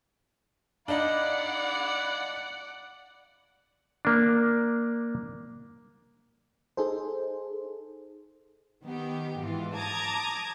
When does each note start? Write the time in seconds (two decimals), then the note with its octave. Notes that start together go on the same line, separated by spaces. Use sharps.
0.88 D4 D#4 D5 F5 F#5 B5
4.05 A#3 D4
6.77 D#4 G#4 A4 C5
8.83 D#3 B3 G4
9.40 G#2 E3 F4
9.75 A5 A#5 D6 D#6 G#6